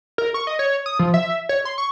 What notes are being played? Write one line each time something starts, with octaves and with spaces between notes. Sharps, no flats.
A#4
C#6
D#5
C#5
D#6
F3
E5
C#5
C6
C#6